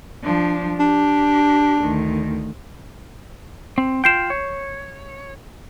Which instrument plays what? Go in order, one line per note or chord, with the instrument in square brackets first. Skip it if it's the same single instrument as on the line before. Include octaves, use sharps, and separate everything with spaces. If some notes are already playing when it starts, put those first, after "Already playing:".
[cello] F3 D4
[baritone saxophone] D4 [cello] G4
[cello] D2 D#3
[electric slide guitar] C4
[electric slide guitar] F4 G5 [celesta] G6 C7 E7
[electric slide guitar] C#5